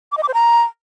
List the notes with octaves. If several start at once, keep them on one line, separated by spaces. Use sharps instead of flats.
D6
D#5
D6
C5
A#5